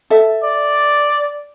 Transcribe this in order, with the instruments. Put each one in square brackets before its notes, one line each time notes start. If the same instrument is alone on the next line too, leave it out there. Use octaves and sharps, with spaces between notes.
[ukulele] A4 E5
[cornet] D5